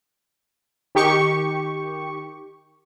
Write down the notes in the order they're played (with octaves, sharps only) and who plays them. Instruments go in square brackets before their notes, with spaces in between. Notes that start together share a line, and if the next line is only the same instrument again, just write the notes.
[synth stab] D#3 G4 C#6